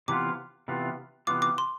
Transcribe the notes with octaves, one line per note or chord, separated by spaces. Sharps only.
C3 E3 B3 F4 D6
C3 E3 B3 F4
C3 E3 B3 F4 D6
D6
C6